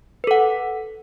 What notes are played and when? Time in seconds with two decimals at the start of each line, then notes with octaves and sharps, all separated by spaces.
0.24 B4
0.27 A4
0.31 F#5